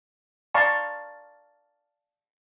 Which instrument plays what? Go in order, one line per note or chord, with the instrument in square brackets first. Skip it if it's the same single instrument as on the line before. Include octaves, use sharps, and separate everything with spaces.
[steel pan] D5 F5 A5 A#5 C6 C#6